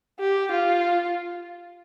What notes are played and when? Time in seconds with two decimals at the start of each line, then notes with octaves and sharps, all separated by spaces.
0.20 G4
0.51 F4